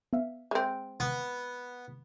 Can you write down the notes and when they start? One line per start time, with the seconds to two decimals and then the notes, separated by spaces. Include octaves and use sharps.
0.13 B3 E5 F5
0.51 G#3 C4 E5
1.00 B3